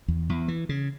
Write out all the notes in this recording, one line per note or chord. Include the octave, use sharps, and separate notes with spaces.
E2
E2
E3
C#3